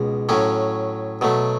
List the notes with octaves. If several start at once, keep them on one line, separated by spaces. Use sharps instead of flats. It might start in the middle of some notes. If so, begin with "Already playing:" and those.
Already playing: C#2 B2 G#3
A2 F#3 C#4
B2 F#3 A3